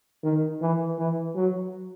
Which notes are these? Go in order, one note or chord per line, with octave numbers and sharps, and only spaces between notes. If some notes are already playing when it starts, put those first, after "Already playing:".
D#3
E3
E3
F#3